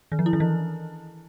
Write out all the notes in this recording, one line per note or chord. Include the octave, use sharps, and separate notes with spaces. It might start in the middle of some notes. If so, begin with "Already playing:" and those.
D#3
F3
E4
D#3
E3